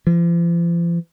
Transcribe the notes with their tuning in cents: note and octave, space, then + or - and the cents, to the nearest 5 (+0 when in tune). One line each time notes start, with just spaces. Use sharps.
F3 -40